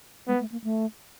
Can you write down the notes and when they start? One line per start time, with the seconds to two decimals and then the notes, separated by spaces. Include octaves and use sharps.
0.28 G#3 B3
0.40 A3
0.52 A#3
0.64 A3